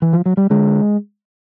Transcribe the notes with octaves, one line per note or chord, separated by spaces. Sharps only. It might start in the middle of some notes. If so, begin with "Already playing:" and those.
E3
F3
F#3
G3
D3 G#3